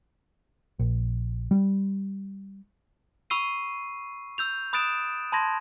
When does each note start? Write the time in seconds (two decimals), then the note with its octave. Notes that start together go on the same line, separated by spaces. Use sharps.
0.79 A#1
1.51 G3
3.30 B5 C#6 E6 C7 D#7
4.38 E6 G6 F7
4.73 B5 D#6 F#6 A6 D7 E7
5.32 A5 B5 C6 G#6 A#6